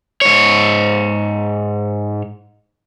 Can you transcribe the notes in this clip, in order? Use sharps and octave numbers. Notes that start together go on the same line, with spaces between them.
G#2 C#5